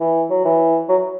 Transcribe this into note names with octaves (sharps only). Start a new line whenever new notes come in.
E3
F#3
E3
F#3